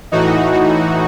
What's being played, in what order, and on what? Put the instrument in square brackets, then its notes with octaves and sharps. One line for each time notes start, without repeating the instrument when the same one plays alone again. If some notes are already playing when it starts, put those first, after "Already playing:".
[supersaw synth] A2 E3 D#4 F#4